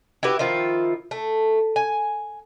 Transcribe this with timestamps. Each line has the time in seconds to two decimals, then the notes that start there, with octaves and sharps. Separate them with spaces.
0.23 E4 F#4 G4 B4
0.39 D#3 F3 E4 F4
1.11 A3
1.76 G#5